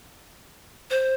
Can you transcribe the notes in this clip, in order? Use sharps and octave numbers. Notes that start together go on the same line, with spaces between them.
C5